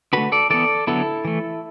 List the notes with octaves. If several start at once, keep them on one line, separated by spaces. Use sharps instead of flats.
D3 A3 F#4 B4
A4 D5
E3 B3 A4 D5
D3 F#3 B3 E4 A4
E3 A3